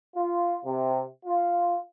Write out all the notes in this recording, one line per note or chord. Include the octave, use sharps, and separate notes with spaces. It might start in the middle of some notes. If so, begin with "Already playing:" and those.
F4
C3
F4